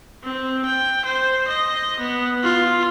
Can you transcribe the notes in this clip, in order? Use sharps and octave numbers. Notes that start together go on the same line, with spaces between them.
C4
G5
C5
D#5
B3
F4